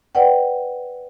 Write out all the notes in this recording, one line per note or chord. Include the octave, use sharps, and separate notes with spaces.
B4 D5 F#5 G5